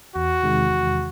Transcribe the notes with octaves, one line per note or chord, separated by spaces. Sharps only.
E2 F#4
C3 D#3 G#3
E2